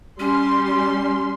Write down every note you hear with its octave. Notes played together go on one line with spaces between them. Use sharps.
G3 C#4 C6